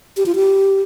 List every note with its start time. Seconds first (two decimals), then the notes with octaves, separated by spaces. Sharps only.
0.17 G4
0.26 F4
0.35 G4